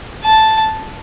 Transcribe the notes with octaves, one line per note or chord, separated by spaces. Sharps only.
A5